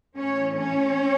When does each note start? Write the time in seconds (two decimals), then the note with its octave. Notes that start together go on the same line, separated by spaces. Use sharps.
0.17 A2 E3 A3 C#4 C#5
0.56 C#4 C#5